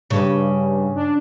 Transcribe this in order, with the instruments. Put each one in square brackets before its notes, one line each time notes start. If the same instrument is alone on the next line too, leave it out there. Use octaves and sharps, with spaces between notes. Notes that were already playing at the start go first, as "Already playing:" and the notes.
[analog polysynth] G2 [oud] C#3
[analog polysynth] D4